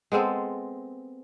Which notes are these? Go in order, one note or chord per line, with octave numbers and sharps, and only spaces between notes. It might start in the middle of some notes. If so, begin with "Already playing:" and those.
G#3 B3 C4 A4